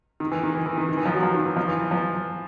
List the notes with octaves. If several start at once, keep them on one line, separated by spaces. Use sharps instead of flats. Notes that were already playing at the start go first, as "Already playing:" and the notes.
D#3
E3
D#3
E3
E3
D#3
D#3
E3
F3
F#3
F3
D#3
E3
F3
E3
E3
F3